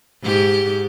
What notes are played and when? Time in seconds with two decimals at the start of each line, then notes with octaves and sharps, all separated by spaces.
0.23 G#2 G4